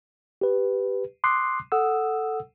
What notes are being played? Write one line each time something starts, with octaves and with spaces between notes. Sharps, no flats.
G4 B4
C6 D6 D#6 F#6 C7
A4 F#5 D#6 E6